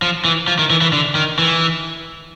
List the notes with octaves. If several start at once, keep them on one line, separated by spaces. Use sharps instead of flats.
F3
E3
F3
D#3
E3
E3
D3
D#3
E3